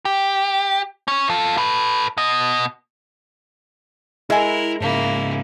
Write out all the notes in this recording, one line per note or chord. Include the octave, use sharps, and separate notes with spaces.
G4
C#4 C#5
F4 A4
A4 B4
B2 D#5
G#3 E4 A#4 E5 G#5 B5
G#2 C#3 A#3 E4